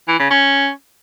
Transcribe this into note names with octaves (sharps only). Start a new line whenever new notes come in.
E3
C#3
C#4